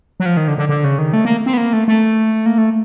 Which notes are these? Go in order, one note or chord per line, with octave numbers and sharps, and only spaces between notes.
F#3
F3
D#3
D3
D3
D3
C#3
D#3
A3
A#3
C4
B3
A#3
A3
A3
A#3
A3